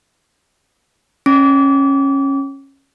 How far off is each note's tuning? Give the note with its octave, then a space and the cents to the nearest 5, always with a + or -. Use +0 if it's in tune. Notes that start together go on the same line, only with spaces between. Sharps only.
C#4 -20 D6 -30